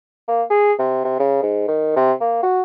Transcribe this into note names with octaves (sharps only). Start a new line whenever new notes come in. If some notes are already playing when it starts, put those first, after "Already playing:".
A#3
G#4
C3
C3
C#3
G#2
D#3
C3
A#3
F#4